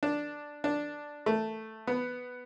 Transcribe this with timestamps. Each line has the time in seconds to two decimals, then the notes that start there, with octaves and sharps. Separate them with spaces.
0.03 D4
0.64 D4
1.26 A3
1.87 B3